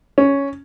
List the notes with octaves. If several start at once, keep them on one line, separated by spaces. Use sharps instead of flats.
C#4